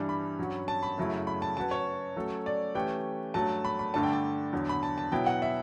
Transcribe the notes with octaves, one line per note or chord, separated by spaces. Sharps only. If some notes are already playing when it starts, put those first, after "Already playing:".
Already playing: G2 E3 G3 D4
B5
G2 F#3 C#4 F#4
A5
B5
F#2 C#3 F#3 A3 E4
B5
A5
F#3 C#4 F#4 B4 A5
C#5
F#3 A3 C#4 F#4 A4
D5
E3 A3 C#4 G4 B4 G5
G2 F#3 A3 A5
B5
B5
G2 D3 A3 D4 A5
G5
A5
E2 D3 F#3
B5
A5
A5
B2 F#3 B3 E4 G5
F#5
E5